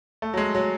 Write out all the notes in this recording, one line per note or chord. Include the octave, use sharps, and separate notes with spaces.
A3
F#3
G#3
F#3